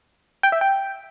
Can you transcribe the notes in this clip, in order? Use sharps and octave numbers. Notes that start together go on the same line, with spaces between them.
G5
E5
G5